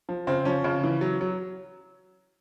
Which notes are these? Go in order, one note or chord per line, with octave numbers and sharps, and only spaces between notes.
F3
C#3 C4
F3 C#4
C#3
E3
F#3
F#3